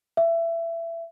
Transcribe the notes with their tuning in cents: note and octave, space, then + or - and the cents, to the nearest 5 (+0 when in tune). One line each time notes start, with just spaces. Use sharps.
E5 +20